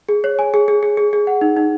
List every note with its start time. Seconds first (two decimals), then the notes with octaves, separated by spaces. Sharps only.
0.09 G#4
0.24 C#5
0.39 G#5
0.54 G#4
0.68 G#4
0.83 G#4
0.97 G#4
1.13 G#4
1.27 F#5
1.41 D#4
1.57 D#4